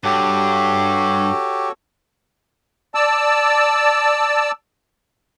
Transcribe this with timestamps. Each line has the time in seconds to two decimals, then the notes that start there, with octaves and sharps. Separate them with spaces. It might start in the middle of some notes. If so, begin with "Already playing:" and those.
0.04 G2 F#4 G4 A4 C#5
2.95 D5 A5 E6